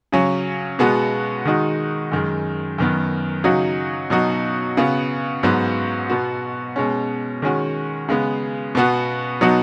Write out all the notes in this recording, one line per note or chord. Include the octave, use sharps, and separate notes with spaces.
C#3 F#3 C#4
B2 G#3 B3 F#4
D#3 G#3 D#4 F#4
F#2 D#3 G#3
F#2 D#3 B3
C#3 F#3 D#4 F#4
B2 F#3 D#4 F#4
C#3 B3 F#4
G#2 F#3 B3 F#4
B2 B3 F#4
B2 G#3 C#4
D#3 G#3 C#4 F#4
C#3 G#3 B3
B2 B3 F#4
B2 F#3 B3 D#4 F#4